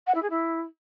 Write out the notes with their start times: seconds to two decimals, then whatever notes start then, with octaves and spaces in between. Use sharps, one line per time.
0.06 F#5
0.14 E4
0.22 G#4
0.30 E4